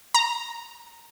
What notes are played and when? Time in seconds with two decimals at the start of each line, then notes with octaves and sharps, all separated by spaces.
0.14 A#5